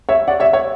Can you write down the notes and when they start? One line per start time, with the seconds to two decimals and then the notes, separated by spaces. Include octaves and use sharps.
0.09 C#5 E5
0.27 D5 F#5
0.40 C#5 E5
0.53 C#5 E5